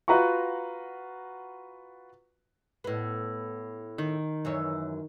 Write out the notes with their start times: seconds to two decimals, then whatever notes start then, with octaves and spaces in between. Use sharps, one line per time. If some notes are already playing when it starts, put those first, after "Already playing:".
0.08 F4 F#4 B4 F#5 A#5 C#6
2.84 A2 B3
3.98 D#3
4.45 F#2 E3 C#5